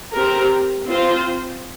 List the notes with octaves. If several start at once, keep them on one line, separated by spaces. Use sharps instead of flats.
C4 G4 A#4
C4 F4 C5